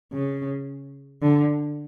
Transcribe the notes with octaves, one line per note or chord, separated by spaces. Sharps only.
C#3
D3